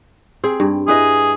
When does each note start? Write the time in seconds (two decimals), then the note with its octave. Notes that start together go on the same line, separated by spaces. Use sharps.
0.44 C4 G#4
0.60 G2
0.88 E4 G#4 B4 D#5